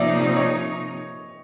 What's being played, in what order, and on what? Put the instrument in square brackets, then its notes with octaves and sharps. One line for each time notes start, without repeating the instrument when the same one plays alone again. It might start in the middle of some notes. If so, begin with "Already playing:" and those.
Already playing: [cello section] C3 F3 A#3 D#4 [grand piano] C#5 D5 E5
[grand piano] C#5 D#5